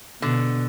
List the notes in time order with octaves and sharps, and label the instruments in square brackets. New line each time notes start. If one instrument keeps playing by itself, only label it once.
[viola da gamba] B2 [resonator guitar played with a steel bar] D3